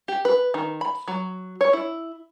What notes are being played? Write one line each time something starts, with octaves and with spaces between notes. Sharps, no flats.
G4
B4
D#3
B5
F#3
C#5
E4